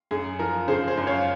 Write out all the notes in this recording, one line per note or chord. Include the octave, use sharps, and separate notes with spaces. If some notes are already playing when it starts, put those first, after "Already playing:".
F#2 G#4
F3 A#4
C#3 G#4 C5
G#4 C5
F#2
C#5 F5